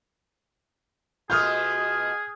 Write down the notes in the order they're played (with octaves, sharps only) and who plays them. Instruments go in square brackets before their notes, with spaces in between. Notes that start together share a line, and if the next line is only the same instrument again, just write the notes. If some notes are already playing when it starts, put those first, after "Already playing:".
[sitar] B2 A3 F4 [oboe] G#4 [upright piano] D#6 F6 G6